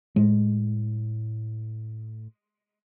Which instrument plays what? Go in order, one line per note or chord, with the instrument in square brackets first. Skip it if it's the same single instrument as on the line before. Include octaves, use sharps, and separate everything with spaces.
[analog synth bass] A2 [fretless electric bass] G#3